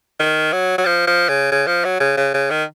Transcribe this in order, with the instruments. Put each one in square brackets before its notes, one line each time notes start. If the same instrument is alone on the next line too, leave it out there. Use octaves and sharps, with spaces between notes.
[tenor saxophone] D#3
F#3
F#3
F3
F3
C#3
C#3
F3
F#3
C#3
C#3
C#3
D#3